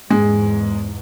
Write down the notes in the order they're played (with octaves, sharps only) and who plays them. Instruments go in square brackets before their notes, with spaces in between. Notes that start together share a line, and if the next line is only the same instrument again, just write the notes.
[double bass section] E2 G#2 [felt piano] G#3